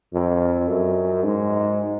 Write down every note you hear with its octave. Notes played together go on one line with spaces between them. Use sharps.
F2
F#2
G#2